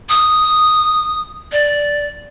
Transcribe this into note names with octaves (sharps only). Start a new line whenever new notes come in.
D#6
D5